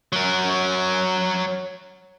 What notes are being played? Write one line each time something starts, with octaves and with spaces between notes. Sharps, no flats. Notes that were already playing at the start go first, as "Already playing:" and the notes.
F#3 A#4